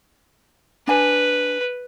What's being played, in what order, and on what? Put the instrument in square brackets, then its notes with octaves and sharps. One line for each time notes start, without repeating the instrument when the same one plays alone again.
[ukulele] D4 G#5 [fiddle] B4